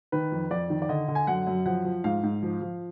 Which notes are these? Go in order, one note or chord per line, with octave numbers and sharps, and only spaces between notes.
D#3 B4
F2
F2 D5
D#3
D5
D3 D#5
D3
G#5
F#2 F#5
F#2
F3 F#5
F3
G#2 F5
G#2
F3
F3